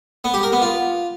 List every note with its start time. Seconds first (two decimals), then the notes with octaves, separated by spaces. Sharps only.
0.24 B3
0.34 G4
0.43 A#4
0.52 B3
0.62 F4